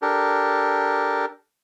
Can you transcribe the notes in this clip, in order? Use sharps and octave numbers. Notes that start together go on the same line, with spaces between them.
D4 G4 A4 A#4